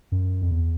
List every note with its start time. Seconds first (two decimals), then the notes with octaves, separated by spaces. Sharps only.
0.12 F#2
0.42 F2
0.51 E2